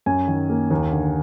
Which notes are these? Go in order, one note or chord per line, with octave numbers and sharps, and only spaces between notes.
F#2 G#5
D#3
A#3
D#2
D3